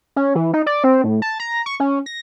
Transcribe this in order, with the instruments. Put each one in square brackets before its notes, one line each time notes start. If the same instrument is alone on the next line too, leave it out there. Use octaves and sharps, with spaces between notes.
[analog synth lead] C#4
E3
D#4
D5
C4
A2
A5
A#5
C#6
C#4
A#6